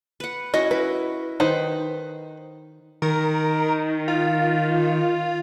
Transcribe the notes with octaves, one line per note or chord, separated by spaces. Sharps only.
B4 F#5
C#4 E4 F#4 D#5
E4 B4
D#3 D#4 B4 C5
D#3 A#4
F4